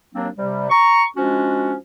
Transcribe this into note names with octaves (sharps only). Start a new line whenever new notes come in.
D#2 F#3 A#3 C4 D4
C3 G3
A#5 C#6
F3 G#3 C#4 D4 F#4